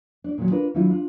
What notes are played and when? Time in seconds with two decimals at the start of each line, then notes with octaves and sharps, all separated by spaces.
0.24 D4 D5
0.38 A#2 D#3 F#3
0.51 D4 F4 A#4 B4
0.74 D#3 F#3 D4 E4 F4
0.90 D4 F4